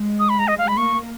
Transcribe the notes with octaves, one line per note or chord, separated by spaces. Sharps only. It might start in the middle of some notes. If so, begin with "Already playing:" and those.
Already playing: G#3
D#6
B5
A#5
D#5
F5
B5
A#3 C#6